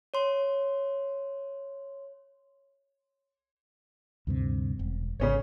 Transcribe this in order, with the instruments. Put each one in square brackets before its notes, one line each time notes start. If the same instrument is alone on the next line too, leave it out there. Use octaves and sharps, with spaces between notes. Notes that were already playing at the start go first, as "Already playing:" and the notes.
[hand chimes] C#5 C6
[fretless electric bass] D2 G2 C3
E1
[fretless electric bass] G#1 [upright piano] C#3 C#4 C#5